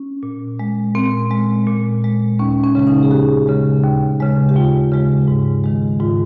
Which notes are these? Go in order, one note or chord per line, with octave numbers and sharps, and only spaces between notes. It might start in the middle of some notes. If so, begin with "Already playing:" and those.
Already playing: C#4
A#2
G#3
A#2 C4
G#3
A#2
G#3
D#2 C#4
C#4
C#3 G#3 C#4
D#4
G#4
D#2 G4
C#3 G#3
D#2
C#3 G#3
G4
D#2 F4
C#3 G#3
G#2
D#3 G#3
G#2 F4